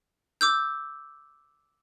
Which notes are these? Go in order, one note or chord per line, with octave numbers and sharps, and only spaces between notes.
D6 E6 G6